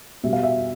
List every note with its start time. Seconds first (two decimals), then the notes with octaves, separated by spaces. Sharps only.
0.23 B2 G3 E5
0.33 F5
0.43 E5